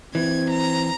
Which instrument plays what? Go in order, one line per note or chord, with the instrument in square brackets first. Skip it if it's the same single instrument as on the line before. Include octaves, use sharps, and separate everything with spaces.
[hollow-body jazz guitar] E3 [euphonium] C4 [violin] G#6
[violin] A#5